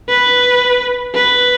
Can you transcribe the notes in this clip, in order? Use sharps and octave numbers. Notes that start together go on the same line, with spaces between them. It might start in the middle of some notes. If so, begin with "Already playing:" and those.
B4
B4